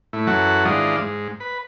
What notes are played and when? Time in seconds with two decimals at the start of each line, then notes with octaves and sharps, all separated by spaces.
0.13 A2 E4
0.27 F#2 E3 F#3 A4 F#5
0.65 G#2 D#3 E3 D4 F4 D#5
0.99 G#2
1.40 B4